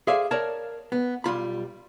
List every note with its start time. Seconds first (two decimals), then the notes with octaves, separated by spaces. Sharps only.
0.07 G#4 A4 C5 D5 E5 F5
0.31 A#4 C#5 D5 A5
0.92 B3
1.24 B1 G3 F4 B5